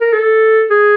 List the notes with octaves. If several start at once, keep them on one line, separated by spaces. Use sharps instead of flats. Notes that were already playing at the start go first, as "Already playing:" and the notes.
A#4
A4
G#4